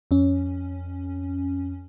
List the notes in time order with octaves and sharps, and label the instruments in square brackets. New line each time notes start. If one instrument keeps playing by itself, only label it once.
[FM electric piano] F2 C#4